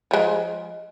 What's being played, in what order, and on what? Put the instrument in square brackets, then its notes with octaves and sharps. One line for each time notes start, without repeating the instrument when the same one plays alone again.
[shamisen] F3 G#3